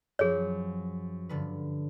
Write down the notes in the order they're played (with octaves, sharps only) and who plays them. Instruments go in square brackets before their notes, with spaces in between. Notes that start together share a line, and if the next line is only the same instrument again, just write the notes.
[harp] F#2 F3 [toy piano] G#4 C#5
[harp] G2 D3 B4